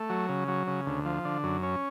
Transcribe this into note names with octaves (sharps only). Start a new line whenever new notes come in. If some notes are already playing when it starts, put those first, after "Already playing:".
Already playing: A3
F#3
C#3
F#3
C#3
D2
F3
D3
F#2
C#4